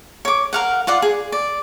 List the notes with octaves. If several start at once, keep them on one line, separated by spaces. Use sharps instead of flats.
C#5 D6
A#4 F5 F#5
F4 D5 F#5
G#4
D5